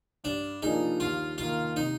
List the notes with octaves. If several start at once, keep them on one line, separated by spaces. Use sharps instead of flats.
G2 D4
F3 A#3 D4 D#4 G#4
D#2 F4
D#3 A#3 F4
C3 D#4